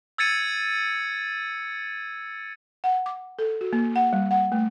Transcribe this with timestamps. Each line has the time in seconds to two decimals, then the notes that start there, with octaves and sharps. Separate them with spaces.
0.18 E6 G#6 A6 C#7 D#7
2.84 F#5
3.06 D6
3.39 A4
3.61 F#4
3.73 A#3
3.96 F#5
4.13 G3
4.31 F#5
4.52 A3